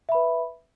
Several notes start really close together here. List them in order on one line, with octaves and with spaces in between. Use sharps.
E5 B5 B4